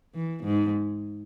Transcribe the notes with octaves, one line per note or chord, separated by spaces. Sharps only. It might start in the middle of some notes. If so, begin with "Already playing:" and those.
E3
G#2